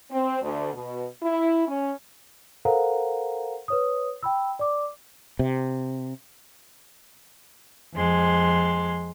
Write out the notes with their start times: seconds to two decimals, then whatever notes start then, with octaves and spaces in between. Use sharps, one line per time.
0.11 C4
0.42 D2
0.74 B2
1.22 E4
1.68 C#4
2.65 A4 A#4 C5 F5 F#5 A#5
3.68 B4 C#5 D#6
4.23 G5 B5 E6
4.59 D5 D6
5.39 C3
7.94 F2 G#3 C6